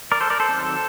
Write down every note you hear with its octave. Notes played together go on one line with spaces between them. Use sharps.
A#4 D5
A4 C5
A#4 D5
A4 C5
D#3 F#3 C4